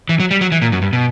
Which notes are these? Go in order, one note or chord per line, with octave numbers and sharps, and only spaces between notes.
E3
F#3
G3
F#3
E3
A#2
F#2
G2
B2